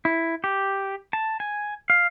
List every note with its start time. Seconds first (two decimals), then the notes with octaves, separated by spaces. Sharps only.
0.05 E4
0.44 G4
1.13 A5
1.40 G#5
1.90 F5